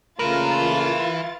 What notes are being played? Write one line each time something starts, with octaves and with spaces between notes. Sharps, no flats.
A#2 C#3 A3 E4 F4 A#4 B4 A6